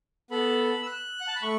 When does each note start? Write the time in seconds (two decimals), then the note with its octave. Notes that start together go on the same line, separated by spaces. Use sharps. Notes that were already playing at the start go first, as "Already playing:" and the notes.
0.31 B3 A4 B5
0.82 E6
0.87 F#6
1.21 F#5
1.28 A5
1.36 B5
1.43 A3 C#6